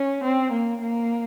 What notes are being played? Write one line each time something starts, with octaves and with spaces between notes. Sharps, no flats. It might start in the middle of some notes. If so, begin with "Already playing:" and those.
Already playing: C#4
C4
A#3
A#3